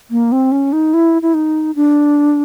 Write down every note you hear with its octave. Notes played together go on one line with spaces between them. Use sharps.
A#3
C4
C#4
D#4
E4
E4
D#4
D4